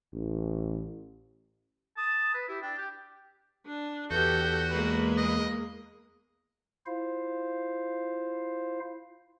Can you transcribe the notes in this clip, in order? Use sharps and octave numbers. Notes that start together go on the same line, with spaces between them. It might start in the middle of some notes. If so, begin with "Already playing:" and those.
A1
A5 D#6
B4
E4 G4
D4 G5
G4
D4
E2 F#4 G4 A4 G6
G#3 A#3 B4
D#5
E4 F4 C5 F5